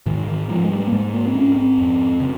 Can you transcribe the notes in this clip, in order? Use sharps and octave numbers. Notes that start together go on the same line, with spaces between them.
G#2 D#3
D#3
G#2 F3
G#3
G3
A#3
G#2 G#3
A#3
C4
G#2 C#4
C4
F2
C#3